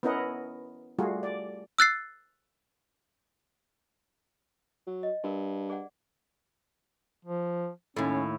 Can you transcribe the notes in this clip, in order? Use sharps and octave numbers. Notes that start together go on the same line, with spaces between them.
B3 C#4 E4 A#4 D#5 F#5
G3 A3 F4 F#4 G#4
D5
E6 F#6 A6 C7
F#3
D#5
G2 F#4 A#4
G#4 D5 F#5
F3
D#2 A2 C#4